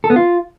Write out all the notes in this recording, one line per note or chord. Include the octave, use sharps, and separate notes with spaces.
A4
B3
F4